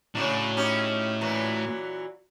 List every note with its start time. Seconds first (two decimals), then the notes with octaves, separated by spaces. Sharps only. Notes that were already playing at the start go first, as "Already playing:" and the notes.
0.15 A2 C#3 F#3 D4
0.57 C#4 D#4 G4
1.21 A#2 E3 F#3